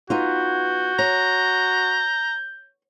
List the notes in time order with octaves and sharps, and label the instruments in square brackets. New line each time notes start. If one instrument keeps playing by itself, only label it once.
[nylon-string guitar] B3 D#4 F4 [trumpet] F#4 [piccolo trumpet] G6
[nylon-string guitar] C#5 [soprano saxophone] A#5